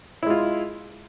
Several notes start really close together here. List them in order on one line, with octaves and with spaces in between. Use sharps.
E4 G#3 F4